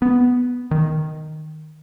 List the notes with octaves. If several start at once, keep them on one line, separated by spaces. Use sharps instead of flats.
B3
D#3